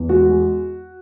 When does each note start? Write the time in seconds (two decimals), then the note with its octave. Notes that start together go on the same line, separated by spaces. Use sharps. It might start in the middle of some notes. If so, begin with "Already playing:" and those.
Already playing: E2
0.09 G#3 F#4
0.29 G#3